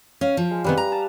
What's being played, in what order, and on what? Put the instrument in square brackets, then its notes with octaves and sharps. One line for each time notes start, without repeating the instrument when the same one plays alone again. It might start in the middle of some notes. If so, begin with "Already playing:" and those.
[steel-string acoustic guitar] C#4 [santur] F5
[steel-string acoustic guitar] F3
[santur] G#3
[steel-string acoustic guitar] C3 D#3 B3 [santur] G3 B4
[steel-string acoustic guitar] A#5
[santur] A5